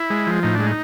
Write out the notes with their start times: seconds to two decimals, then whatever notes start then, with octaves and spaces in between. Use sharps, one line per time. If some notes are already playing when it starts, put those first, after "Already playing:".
Already playing: E4
0.10 G#3
0.27 F3
0.43 A2 D#4
0.55 G#3 D4
0.67 D#4